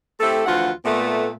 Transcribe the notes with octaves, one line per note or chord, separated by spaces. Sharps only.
A3 C4 E4 G4 A4
D2 E3 F3 F4 F#4 F#5
A#2 A3 B3